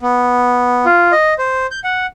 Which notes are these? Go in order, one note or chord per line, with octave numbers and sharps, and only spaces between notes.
B3
F4
D#5
C5
G6
F#5